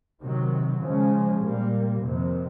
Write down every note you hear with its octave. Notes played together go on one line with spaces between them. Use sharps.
C3 D#3 F#3
C#3 F3 G#3 C#4
A#2 G3 A#3
F2 C3 D#3